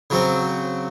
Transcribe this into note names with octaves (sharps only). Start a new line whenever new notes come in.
C#3 F#3 C4